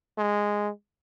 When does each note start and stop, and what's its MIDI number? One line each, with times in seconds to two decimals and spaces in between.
0.18 0.69 56